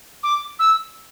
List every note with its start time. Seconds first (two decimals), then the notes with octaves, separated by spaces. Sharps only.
0.23 D6
0.59 E6